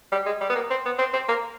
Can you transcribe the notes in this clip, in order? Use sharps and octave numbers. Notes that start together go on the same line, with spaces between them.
G3
G#3
G3
B3
A#3
C4
B3
C4
C4
A#3